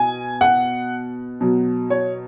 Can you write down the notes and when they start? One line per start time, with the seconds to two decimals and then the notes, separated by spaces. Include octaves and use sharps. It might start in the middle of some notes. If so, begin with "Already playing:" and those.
Already playing: B2 G#5
0.41 F#5
1.41 B2 F#3
1.90 C#5